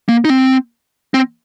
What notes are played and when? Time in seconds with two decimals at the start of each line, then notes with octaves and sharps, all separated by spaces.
0.09 A#3
0.25 D#4
0.30 C4
1.14 C4